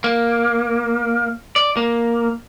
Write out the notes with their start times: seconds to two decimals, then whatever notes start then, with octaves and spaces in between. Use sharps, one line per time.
0.04 A#3
1.56 D5
1.77 A#3